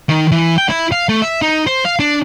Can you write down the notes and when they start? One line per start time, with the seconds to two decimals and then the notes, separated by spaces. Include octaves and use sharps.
0.09 D#3
0.32 E3
0.58 G5
0.69 E4
0.92 F5
1.09 A3
1.22 E5
1.42 D#4
1.67 C5
1.85 F5
1.99 D4